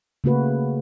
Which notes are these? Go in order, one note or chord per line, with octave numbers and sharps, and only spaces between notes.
C#3 A3 A#3 F#4 B4